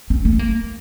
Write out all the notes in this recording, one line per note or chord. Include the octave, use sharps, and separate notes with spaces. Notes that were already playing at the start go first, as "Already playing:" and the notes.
C4
A3
C4
A#3